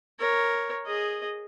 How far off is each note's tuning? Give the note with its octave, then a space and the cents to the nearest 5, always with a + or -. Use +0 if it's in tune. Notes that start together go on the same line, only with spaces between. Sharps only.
A#4 +0 C#5 +0
G#4 +0 D#5 -10